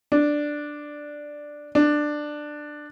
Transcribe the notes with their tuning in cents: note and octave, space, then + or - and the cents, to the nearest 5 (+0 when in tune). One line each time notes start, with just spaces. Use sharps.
D4 +5
D4 +15